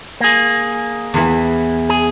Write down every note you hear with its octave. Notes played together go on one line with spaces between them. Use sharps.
A#3 G#4
E2 E3
G#4